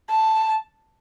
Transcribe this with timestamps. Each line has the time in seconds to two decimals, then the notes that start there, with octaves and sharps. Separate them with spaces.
0.10 A5